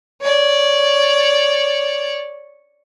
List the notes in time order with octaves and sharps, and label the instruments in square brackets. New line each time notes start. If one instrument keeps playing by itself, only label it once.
[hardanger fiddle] C#5 D5